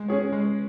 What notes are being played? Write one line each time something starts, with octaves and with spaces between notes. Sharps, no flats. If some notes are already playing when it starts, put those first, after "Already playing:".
Already playing: G#3
C#4 G#4 C#5
G#3